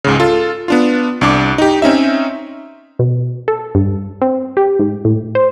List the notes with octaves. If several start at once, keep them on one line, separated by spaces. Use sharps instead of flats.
C#2 G#2 C#3
F4 A4
B3 D4 F4
C2 D4 D6
D#4 G4
C4 C#4 D#4 E5
B2
A4
G2
C4
G4
G#2
A2
C5